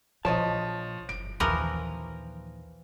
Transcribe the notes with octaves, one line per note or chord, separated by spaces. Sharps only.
A#1 A#2 F3 C#5 D#5 A5
F#1 D7
A#1 D#2 E3 F3 A#4